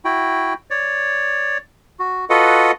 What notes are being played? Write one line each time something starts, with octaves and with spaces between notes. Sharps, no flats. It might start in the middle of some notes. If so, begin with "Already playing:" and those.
E4 F#4 G5
C#5 D5
F#4
F4 F#4 A4 B4 D#5 F#5